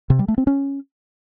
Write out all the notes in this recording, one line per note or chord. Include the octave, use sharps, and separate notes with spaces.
C3
G3
A3
C4
C#4